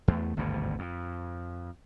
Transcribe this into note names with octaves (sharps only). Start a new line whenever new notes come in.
E2 A3
G#1 D2 G2 B2
F2